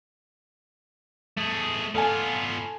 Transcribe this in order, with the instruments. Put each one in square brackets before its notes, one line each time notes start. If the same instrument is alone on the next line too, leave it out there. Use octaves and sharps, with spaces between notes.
[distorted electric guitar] A3 G#4
[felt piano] A3 G#5 [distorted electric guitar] B3 F4